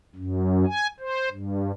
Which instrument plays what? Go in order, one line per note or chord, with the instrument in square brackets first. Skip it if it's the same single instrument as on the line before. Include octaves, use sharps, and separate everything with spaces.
[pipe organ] F#2
G#5
C5
G2